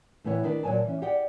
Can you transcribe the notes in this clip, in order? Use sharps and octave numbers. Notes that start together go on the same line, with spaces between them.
A2 E3 B3 E4 C#5
D#3 D4 B4
A#2 F#3 C#5 G#5 A5
E3 C#4
G4 G#4 D5 F#5 G5